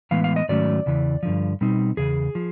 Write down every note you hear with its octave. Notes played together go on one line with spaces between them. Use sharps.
A2 E3 G#3 B3 F5
F5
D#5
G#2 D#3 F#3 A3 C#4 D5
E2 C#3 E3
G2 D3 F3
B2 G3 C4 D#4
E2 C#3 G#4
F3